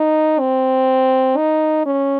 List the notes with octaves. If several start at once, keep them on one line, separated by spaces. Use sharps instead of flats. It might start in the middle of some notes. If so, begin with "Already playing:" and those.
Already playing: D#4
C4
D#4
C#4